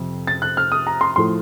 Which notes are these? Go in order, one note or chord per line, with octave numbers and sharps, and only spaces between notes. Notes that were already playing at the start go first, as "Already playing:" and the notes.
Already playing: F2 C3
A6
F#6
F6
D#6
A#5
C6
A2 F3 A3 C6